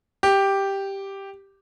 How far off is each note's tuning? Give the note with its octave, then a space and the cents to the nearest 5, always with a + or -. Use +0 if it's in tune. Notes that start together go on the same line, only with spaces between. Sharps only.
G4 +0